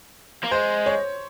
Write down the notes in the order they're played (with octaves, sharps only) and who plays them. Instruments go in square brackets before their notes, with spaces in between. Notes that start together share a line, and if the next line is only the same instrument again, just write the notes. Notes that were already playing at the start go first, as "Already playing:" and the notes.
[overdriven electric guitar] A#3
[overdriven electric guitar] G#3 [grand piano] C5
[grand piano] C#5